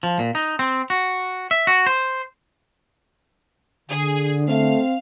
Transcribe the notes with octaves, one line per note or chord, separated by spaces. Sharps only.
F3
A#2
D#4
C4
F#4
E5
F#4
C5
D3 G#4
A3 C4 F5